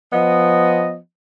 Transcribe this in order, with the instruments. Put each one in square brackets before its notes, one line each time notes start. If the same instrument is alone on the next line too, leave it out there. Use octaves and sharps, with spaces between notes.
[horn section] F3 B3 D#5